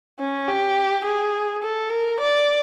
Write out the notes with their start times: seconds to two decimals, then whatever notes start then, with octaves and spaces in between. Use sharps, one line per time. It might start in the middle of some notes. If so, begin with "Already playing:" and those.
0.19 C#4
0.48 G4
1.05 G#4
1.63 A4
1.90 A#4
2.20 D5